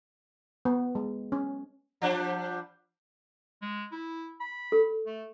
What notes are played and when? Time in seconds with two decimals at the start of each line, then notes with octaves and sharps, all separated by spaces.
0.65 B3
0.95 G#3
1.32 C#4
2.02 F3 G3 D4
3.62 G#3
3.92 E4
4.40 B5
4.72 A4
5.06 A3